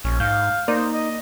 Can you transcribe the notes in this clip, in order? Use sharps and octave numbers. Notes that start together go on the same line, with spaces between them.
A#1 C#4
G#2 F5 G6
A#3 D#4 C5 D5
D#5